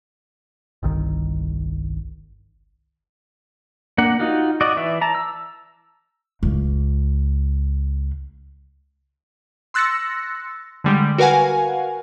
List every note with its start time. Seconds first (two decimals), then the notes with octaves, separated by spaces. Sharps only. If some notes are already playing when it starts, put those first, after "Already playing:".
0.83 G1 C2 D#3
3.98 A#3 D4 F#5
4.20 D#4 F4 F#4
4.61 F#4 D5 D#5
4.77 E3 D5 E5
5.01 A5 A#5
5.15 E6
6.43 C#2 C#3
9.74 C6 E6 F#6 A6 A#6 C#7
10.84 D3 G3 G#3
11.18 F#4 A#4 B4 F5 F#5 G#5